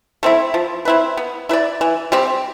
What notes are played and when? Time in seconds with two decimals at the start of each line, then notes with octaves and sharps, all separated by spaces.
0.23 A3 C4 E4
0.54 F3
0.85 C4 E4 B4
1.17 B3
1.49 E4 B4
1.53 D5
1.81 E3
2.12 G3 C4 G4